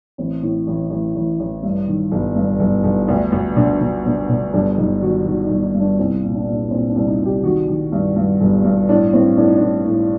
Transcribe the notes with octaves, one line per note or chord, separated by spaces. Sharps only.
A1 C4
A2
A1
A1
A1
A1
G2
D#3
G1
G2
G1
G1
D2
D2
D3
D3
D3
D3
G1 D4
G1 D#4
D#3 F#4
D#3 F#4
D#4
G1
D#4
G2
D4
C2 C4
A#2
D4
A#2
D4
A#2 C4
D4
C2
D#4
C2
G4
D#3 F#4
D#3
G2
G2
G1
G2
A2 D4
A2 C4
A2 D4
D#4
D4
A2
A2